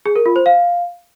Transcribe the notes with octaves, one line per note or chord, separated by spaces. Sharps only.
G#4
A#4
F4
C5
F5